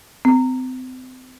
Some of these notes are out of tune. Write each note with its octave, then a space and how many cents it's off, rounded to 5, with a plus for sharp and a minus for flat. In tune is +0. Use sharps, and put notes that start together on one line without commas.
C4 -35